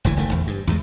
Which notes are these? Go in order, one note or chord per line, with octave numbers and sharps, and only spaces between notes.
F#1 D2 C3 E3
F#1 D#3 A3
A#1 E2
G2
E2 A2 E3 G#3